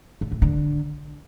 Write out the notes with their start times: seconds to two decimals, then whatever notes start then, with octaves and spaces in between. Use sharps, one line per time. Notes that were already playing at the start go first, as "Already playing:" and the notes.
0.21 D3
0.32 A2
0.42 D3